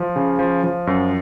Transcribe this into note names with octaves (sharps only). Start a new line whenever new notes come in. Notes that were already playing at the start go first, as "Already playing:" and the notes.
Already playing: F3
C#3
F3
F3
F#2